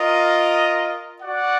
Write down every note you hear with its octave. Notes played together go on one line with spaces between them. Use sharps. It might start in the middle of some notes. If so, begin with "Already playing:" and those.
Already playing: F4 A#4 D#5
F#4 D5 F#5